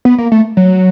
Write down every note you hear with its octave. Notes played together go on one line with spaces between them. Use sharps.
B3
A#3
A3
F#3